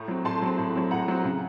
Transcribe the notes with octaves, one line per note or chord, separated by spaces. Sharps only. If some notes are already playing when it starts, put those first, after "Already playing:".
Already playing: A2 A#5 C#6
F#3 C4
A2 A5 C6
F#3 C4
A2
F#3 C4
A2 F#5 A#5
F#3 C4
C#3